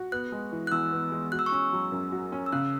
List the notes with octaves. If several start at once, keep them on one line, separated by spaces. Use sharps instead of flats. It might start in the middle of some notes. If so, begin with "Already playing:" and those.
Already playing: F#4
B3 F#6
G#3
E3
F#6
E2 E6
B3
G#3
F#4 F#6
E6
C#6
C#4 E6
F#3
F#2
F#4
C#4
E6
C#3 F#6